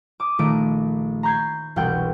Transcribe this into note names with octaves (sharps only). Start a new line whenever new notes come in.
D6 D#6
A#1 D#3 A3 D#6 D7
A#5 B5 C#6 G6 G#6 C7
E1 C2 B2 F#5 G5 G6